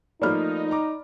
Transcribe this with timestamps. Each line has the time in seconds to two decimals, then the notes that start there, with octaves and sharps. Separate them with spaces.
0.22 F3 A3 A#3 D#4 D5 B5 F6
0.71 A#5 D6